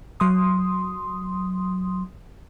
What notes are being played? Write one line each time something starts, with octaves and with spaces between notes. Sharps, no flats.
F#3 C6 D#6